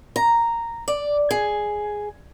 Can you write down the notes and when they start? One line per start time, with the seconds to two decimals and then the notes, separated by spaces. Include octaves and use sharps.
0.16 A#5
0.88 D5
1.31 G#4